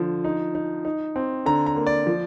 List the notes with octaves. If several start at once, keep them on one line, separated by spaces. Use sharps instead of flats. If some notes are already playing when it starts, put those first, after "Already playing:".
Already playing: D3 F3
D#4
D#4
D#4
C4
D3 A#5
A#5
A#3
D5
F3